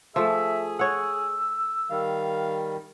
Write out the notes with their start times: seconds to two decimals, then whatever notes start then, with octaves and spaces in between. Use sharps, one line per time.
0.16 F3 A3 G#4 E5
0.79 C#5 F#5 E6
1.90 D#3 G3 F5